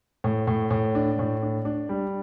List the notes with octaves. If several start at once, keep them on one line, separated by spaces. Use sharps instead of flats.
A2
A2
A2
D4
A2
D4
D4
G3